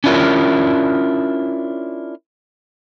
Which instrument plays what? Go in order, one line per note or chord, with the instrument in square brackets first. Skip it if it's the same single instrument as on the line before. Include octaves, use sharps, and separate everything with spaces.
[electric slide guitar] C#4 D4 E4 F4 A#4 C#5